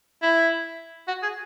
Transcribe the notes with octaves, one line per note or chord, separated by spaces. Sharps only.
E4
F#4
G#4